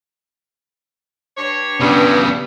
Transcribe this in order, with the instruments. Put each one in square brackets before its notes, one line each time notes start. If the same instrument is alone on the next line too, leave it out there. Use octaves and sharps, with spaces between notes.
[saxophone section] G2 D4 C#5
[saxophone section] G2 [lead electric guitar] C#3 B3